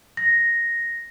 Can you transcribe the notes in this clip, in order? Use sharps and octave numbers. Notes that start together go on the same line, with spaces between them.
A#6